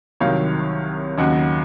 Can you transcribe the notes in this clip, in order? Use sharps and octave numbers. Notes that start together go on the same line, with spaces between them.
C2 C3 D#3 F#3 C#5 F5
D#2 C#3 F#3 D#5 F#5